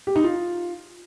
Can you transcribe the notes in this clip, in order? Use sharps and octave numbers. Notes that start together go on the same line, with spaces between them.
G4
D#4
F4